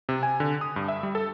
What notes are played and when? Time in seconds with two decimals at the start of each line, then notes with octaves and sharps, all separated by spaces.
0.09 C3
0.23 G#5
0.40 D3
0.61 D#6
0.76 G2
0.88 E5
1.03 G3
1.15 A4